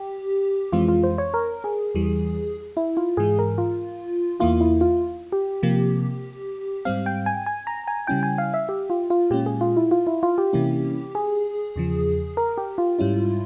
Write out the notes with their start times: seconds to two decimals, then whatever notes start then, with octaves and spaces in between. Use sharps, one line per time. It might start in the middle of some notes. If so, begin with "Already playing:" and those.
Already playing: G4
0.72 F2 E3 G#3 C4 F4
0.88 F4
1.03 C5
1.18 C#5
1.34 A#4
1.64 G#4
1.95 E2 E3 G3
2.77 E4
2.97 F4
3.17 G#2 E3 G#3 G#4
3.39 A#4
3.58 F4
4.40 E2 E3 A#3 E4 F4
4.61 E4
4.81 F4
5.32 G4
5.63 C3 F3 A#3
6.85 G#2 G3 C4 F5
7.06 G5
7.26 G#5
7.46 G#5
7.67 A#5
7.88 G#5
8.07 C#3 G3 C#4 E4 G5
8.23 G#5
8.38 F5
8.54 E5
8.69 G4
8.90 F4
9.10 F4
9.30 A#2 G#3 C#4 G4
9.46 G#4
9.61 F4
9.77 E4
9.91 F4
10.07 E4
10.23 F4
10.38 G4
10.53 C3 E3 A#3 C#4 E4
11.15 G#4
11.76 E2 C#3 F3
12.37 A#4
12.58 G4
12.78 F4
12.99 G#2 G3 C#4 E4